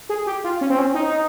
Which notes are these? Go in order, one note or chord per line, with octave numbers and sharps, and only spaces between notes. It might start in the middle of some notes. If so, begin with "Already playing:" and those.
G#4
G4
F4
C#4
C4
C#4
D#4